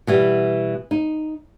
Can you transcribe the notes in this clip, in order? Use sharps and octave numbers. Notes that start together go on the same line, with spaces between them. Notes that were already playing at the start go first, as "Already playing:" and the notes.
B2 E3 G3
D#4